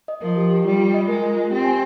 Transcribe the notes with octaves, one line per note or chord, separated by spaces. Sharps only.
D#5
F3 A#4
G4
G4
G3 F4
F4
D#5
G#3 A#4
F4
F4
C4 G4
G#5